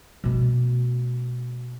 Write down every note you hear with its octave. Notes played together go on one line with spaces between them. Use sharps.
B2 A3